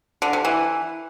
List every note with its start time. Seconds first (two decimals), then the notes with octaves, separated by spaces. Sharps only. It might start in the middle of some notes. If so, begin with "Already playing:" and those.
0.22 D3
0.33 C3
0.45 E3